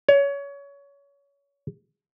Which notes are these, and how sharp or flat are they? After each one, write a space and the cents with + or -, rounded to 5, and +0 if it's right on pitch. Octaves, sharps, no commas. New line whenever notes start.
C#5 +25